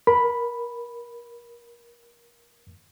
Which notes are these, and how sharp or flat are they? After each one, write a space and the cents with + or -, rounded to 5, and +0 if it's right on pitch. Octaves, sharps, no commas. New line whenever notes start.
A#4 +25 B5 +0